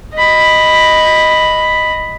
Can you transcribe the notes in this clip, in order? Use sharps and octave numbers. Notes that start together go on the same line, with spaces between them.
D#5 B5